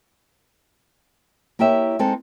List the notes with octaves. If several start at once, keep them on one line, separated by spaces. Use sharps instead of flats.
A#3 E4 G4 C#5 E5
G#3 C4 D#4 A4